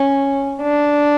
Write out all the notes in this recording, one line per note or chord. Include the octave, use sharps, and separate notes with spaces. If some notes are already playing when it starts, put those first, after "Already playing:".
Already playing: C#4
D4